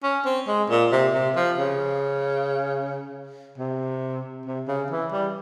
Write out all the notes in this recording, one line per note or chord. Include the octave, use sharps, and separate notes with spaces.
C#4
C4
G#3
A#2
C3
C3
F3
C#3
C3
C3
C#3
E3
G3